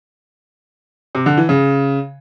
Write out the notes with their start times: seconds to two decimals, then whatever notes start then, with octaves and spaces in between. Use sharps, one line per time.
1.15 C3
1.26 D3
1.37 E3
1.49 C#3